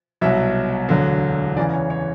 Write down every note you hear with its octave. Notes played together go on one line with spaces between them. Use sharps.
C2 B2 F#3 E5
E1 D2 D3 F#3
E2 C#3 E3 D5
C#5
C#5